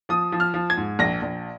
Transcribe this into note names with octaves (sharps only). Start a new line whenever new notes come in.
F3 D#6
F3
F6
F3
G#6
G#2
A#1 A#6
A#1